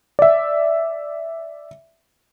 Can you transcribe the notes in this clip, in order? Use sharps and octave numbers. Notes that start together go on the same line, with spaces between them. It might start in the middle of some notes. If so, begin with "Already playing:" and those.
D5 E5